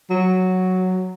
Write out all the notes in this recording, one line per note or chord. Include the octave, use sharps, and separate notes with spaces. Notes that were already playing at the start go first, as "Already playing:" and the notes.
F#3